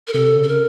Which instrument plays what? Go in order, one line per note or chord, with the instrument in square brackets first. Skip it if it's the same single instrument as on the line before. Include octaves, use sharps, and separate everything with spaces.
[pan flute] A#4
[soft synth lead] C3 [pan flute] A4
[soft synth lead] C#3
[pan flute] A4
A#4